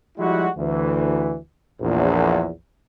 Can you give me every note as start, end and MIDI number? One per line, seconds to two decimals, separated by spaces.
0.18 0.48 53
0.18 0.48 55
0.18 0.48 56
0.18 0.48 64
0.18 0.48 66
0.57 1.36 38
0.57 1.36 52
1.81 2.50 34
1.81 2.50 40